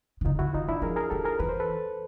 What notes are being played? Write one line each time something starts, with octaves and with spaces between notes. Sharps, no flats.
D3
C#3 D#4 F4
D3 E4 F#4
D#3 D#4 F4
E3 D4 E4
F3 G#4 A#4
G#4 A#4
E3 G4 A4
G#4 A#4
E3 B4
C5
A4 B4